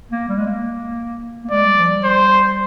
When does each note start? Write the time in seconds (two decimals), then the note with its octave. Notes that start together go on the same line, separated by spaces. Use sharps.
0.11 A#3
0.29 G3
0.38 G#3
0.46 A#3
1.44 A#3
1.51 G#3 D5
1.64 G3
1.78 F3
1.90 G3
2.04 C5